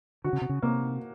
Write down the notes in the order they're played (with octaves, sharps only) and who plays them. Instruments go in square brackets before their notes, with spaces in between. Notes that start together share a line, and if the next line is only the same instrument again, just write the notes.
[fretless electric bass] D3 [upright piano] F#4
[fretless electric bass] C#3
C3
C#3
[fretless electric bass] C3 [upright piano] A#3